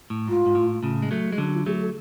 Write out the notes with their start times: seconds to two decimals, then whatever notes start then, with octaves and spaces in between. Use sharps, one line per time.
0.10 A2
0.28 G#2 F4
0.46 G#2
0.55 A2
0.83 A2 C#3
1.02 G#3
1.11 F#3 A3
1.33 G#3
1.38 D3 F#3 D4
1.53 F4
1.65 F#3 A3 G#4
1.80 A4